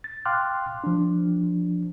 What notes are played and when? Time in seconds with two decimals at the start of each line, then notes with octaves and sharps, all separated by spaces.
0.04 A6
0.25 F5 G5 C6 D6 F6 F#6
0.84 F3 D4